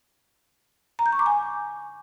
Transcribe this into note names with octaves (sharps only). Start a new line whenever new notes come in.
A#5
G6
C#6
D6
G#5